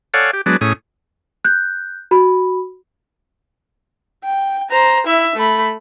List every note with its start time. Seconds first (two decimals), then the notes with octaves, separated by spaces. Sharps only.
0.14 A4 C#5 D5 F5 F#5 G#5
0.33 G4
0.46 F#3 G#3 B3 D4
0.61 A2 C#4 G#4 D#6
1.45 F#6 G6
2.11 F#4 B5
4.24 G5
4.71 C5 A#5
5.07 E4 E5
5.36 A3 B5